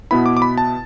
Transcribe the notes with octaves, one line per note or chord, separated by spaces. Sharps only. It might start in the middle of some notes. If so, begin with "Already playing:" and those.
B2 B3 E4 B5
D6
D6
B5
A5